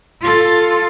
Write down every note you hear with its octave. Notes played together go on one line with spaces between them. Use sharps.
F4 A4